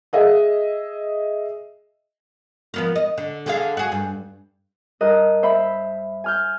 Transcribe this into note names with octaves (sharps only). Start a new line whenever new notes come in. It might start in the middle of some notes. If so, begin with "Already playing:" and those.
G#4 D#5 E5
F3 B3 A#4
D#5
D3
D3 G#4 F5
F#4 G#4
G2
G2 A#4 D#5 F#6
C5 E5 B5
G#5 F6 G6